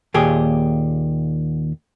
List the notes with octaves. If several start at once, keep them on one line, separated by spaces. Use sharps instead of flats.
D#2 A#2 G4 G#4